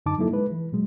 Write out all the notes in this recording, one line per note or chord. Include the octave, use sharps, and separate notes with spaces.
F#2 D3 D#4 A5 D6
F#3 A#3 D#4 E4 A4
G#3 B4
E3
A#2 F#3 G#3